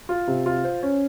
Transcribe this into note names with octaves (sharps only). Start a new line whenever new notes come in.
F4
C3
F4
C5
C#4